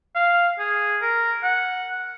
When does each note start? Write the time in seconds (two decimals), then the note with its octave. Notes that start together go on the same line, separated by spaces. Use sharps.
0.15 F5
0.59 G#4
1.02 A#4
1.43 F#5